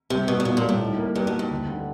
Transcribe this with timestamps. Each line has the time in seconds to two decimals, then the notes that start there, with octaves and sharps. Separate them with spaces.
0.10 C3 G3
0.28 B2 G3
0.40 A#2
0.45 B2 F4
0.57 A#2
0.63 G3
0.69 A2
0.81 D#4
0.98 A#3
1.15 G2 G3
1.27 B2
1.33 D#4
1.39 G2
1.51 D2
1.69 D3